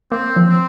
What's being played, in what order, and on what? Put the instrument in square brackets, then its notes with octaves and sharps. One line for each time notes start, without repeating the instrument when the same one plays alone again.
[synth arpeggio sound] A#3 [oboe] C4
[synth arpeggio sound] F3
[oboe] C4